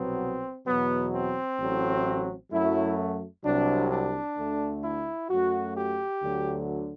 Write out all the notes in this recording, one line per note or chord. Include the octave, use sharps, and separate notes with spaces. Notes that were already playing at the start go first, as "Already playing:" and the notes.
Already playing: C2 B2 F#3 B3 C4
E2 B2 F#3 B3
C4
A1 A2 F#3
F#2 F#3 A3 E4
C2 C3 F#3 D4
D4
D2 D3 A3
E4
F#2 F#3 A3 F#4
G4
D2 D3 F#3